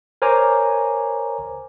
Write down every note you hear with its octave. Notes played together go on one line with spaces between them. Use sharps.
A#4 C5 C#5 G#5 A#5 D6